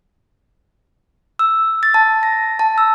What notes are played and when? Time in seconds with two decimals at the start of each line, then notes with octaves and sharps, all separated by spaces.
1.39 E6
1.83 A6
1.94 A5
2.23 A#6
2.59 A5
2.78 E6